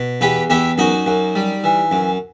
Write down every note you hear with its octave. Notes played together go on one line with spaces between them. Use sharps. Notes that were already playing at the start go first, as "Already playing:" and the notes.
Already playing: B2
E2 G4 B4
E2 E4 G4
F#2 D#4 F#4
F#2
G3
E3
F#2